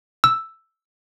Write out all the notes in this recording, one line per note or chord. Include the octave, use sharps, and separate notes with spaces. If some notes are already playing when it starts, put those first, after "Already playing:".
E6